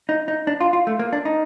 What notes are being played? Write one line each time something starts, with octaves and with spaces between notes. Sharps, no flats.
D#4
D#4
D4
F4
F4
A3
A#3
D4
D#4